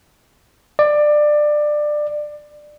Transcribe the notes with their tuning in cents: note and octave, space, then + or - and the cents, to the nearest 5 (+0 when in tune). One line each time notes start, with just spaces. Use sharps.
D5 +20